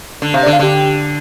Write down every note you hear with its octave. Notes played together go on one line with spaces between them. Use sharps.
D3
C3 F5
D5
D3
F5
D3 G4